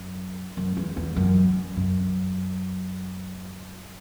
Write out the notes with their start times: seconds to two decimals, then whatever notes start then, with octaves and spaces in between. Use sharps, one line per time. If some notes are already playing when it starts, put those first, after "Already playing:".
Already playing: F#2
0.57 F#2
0.77 E2
0.97 E2
1.16 F#2
1.76 F#2